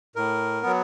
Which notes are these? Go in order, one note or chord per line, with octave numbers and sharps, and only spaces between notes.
A2 A#4
F#3 B3